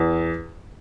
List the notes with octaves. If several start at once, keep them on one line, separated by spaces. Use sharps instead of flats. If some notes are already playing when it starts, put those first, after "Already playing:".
Already playing: E2